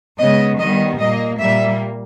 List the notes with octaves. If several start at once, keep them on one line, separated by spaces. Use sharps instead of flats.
C#3 G#3 B3 D#5
D#3 G3 B3 D#5
A#2 A#3 D#5
A#2 G3 A#3 E5